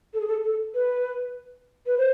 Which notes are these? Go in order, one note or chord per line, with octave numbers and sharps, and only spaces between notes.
A4
G#4
A4
A4
B4
B4
C5